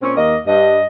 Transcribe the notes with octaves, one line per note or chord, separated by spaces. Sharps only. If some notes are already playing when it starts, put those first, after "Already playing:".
A#2 C4 C#4
D#2 A#3 D#5
G2 D#5